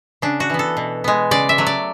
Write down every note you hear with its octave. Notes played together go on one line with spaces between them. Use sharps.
C#3 D4
F#4
E3 B3
A4
B2
G#3 B3
C#3 D5
E5
F#3 A3
D5